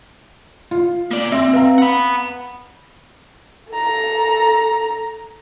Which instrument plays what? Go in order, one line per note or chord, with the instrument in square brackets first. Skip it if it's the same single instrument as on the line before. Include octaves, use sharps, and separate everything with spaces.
[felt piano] F4
[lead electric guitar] A#3 D5
[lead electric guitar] C4 [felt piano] E5 C6
[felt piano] B4 F5 A#5
[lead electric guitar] F#5 B5
[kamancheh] A4 A#5